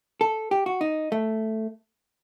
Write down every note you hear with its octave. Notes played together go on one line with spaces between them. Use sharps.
A4
G4
F#4
D#4
A3